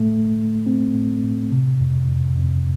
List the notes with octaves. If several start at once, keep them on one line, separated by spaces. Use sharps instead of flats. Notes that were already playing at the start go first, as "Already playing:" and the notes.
Already playing: A2 A3
A2
A2
A2 C4
A2
A2
C3
F2
F2
F2